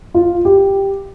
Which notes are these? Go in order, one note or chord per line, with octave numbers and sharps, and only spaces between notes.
F4
G4